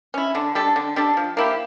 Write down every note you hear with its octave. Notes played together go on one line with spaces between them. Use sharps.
C#4 E4
D3
G3 D4 A4
D3
G3 D4 A4
F3
A#3 E4 G4